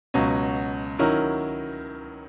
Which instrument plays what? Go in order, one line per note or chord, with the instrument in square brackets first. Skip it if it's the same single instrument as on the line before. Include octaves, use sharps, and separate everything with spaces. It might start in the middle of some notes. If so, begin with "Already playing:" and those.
[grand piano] C#2 B2 F#3 C#4
D#3 F#3 C#4 E4 A#4